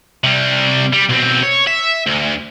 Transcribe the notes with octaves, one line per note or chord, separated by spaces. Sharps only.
C3 G3
G3
B1 C4
C#5
E5
D2